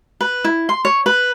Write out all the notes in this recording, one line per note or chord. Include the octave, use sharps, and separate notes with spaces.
B4
E4
C6
C#5
B4